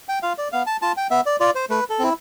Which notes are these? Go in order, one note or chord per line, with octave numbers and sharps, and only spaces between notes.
G5
F4 F5
D5
B3 F5
A5
F4 A5
G5
B3 E5
D5
F4 D5
C5
A3 B4
A4
C4 E4